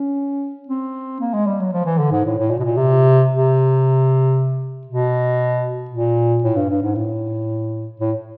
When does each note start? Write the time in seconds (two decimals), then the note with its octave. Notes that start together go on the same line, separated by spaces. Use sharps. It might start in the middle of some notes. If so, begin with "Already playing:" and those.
Already playing: C#4
0.68 C4
1.20 A#3
1.34 G#3
1.46 G3
1.60 F#3
1.72 F3
1.86 E3
1.99 D3
2.11 G#2
2.25 A2
2.38 A2
2.51 A#2
2.59 B2
2.64 A#2
2.77 C3
3.30 C3
4.87 B2
5.91 A#2
6.44 A2
6.56 G2
6.69 G2
6.82 G#2
6.95 A2
8.00 A2